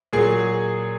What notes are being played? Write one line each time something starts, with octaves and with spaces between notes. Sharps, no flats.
A#2 F#3 G#4